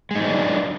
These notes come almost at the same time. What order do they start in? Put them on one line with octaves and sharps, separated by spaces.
G#3 D#4 F#3 D4